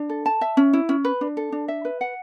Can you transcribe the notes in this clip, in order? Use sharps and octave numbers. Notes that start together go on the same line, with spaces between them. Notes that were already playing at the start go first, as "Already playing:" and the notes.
Already playing: D4
A4
A5
E5
C#4
E4
C#4
B4
D4
A4
D4
E5
B4
F#5